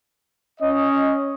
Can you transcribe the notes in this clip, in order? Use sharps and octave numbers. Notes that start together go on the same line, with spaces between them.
C#4 D#5